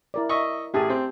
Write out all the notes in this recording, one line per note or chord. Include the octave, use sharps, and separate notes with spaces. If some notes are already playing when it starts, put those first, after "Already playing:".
E4 A#4 D5
D#5 E5 C#6
A1 G4 G#4 G#5 A5
C4